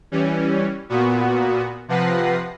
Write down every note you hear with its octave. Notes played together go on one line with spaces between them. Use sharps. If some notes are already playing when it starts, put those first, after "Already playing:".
E3 G3 C#4
A#2 B3 F#4
C3 F3 B4 F#5 A#6 C7